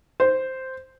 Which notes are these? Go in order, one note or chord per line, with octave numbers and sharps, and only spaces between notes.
C5